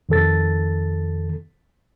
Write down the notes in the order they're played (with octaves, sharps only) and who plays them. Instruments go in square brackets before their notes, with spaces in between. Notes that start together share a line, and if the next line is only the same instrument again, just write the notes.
[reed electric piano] F2 D#3 A4 A6